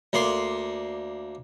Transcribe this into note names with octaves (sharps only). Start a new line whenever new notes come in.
D2 A#3 D5 C6